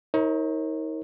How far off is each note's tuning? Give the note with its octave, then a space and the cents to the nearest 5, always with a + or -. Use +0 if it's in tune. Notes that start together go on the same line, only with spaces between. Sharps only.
D#4 +40 A#4 +0 C#5 -35